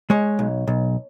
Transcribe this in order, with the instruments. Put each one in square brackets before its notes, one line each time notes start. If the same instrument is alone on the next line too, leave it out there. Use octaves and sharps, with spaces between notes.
[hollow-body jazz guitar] G#3 C#5
B1
B1